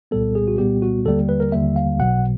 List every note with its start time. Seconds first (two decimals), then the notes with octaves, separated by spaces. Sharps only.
0.11 C2 A#2 G3 B3 A4
0.35 G#4
0.48 F#4
0.58 C2 A#2 G3 B3 G4
0.82 F#4
1.05 D#2 D3 G3 A#3 A4
1.29 B4
1.40 A#4
1.52 D#2 D3 G3 A#3 E5
1.76 F5
1.99 B1 B2 F#3 F#5